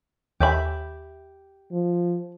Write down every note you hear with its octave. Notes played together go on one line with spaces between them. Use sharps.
D#2 G4 E5 B5
F3